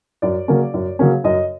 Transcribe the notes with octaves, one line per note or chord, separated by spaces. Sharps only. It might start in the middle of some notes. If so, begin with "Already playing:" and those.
F#2 D5
C#3 F#3 A#3 C#4
F#2
C#3 F#3 A#3 C#4
F#2 D#5